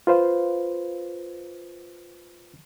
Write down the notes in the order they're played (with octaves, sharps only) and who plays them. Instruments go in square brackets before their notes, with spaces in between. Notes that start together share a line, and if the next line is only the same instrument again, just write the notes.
[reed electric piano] F4 B4 C5 F5